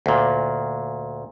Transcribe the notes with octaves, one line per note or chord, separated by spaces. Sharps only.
D2 A#2